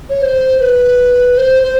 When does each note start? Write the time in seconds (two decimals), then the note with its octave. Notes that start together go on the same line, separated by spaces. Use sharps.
0.09 C#5
0.22 C5
0.60 B4
1.37 C5
1.63 C5